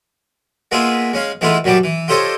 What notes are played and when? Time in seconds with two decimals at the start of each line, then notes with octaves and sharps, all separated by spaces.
0.71 G#3 A#3 B3 F4 G#4 E5
1.13 G#3 C#4 F5
1.41 E3 G#3 A3 B3 E4 F4
1.64 F#2 F#3 G3 B3 A5 D6
1.84 E3
2.08 F4 G4 A4 C5 C#5 D#5